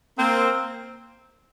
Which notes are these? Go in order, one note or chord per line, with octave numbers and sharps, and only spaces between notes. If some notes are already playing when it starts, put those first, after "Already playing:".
A#3 C4